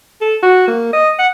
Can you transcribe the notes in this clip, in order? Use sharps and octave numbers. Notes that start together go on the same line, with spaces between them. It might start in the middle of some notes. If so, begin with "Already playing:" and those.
A4
F#4
A#3
D#5
F#5